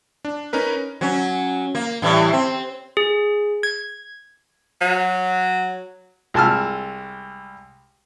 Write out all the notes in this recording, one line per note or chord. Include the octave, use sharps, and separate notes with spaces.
D4
C#4 D#4 A#4 B4
F#3 C#4
A#3
A2 E3 G3
C4
G#4
G#6
F#3
C2 G#3 G#5 A5 E6 F6